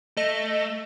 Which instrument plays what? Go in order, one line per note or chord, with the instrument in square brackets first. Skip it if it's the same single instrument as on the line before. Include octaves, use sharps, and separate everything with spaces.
[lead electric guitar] A3 [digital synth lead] D#5